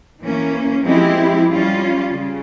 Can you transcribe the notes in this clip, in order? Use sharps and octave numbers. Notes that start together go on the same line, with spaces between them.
E3 A#3 C#4
F3 G#3 C4 E4 G4
G3 C#4 F4
C#3